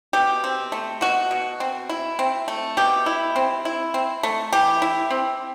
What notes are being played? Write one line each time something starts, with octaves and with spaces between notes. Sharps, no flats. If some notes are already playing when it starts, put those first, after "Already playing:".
B2 G4
C4
A3
B2 F#4
B2
C4
E4
C4
A3
B2 G4
E4
C4
E4
C4
A3
E3 G4
E4
C4